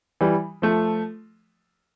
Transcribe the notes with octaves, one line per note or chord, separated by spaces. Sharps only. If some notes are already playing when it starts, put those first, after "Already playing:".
E3 G3
F3 A3